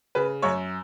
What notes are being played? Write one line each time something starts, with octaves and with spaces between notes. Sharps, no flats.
C#3 B4
F#2 C#5